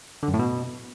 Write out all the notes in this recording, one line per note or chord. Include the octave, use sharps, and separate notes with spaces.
D3
F#2
A2
B2